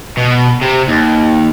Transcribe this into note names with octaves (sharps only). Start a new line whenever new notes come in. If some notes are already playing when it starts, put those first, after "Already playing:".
B2
C3
D#2